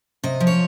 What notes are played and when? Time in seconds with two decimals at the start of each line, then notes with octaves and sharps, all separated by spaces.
0.24 C3 D#5
0.40 F3
0.47 C#5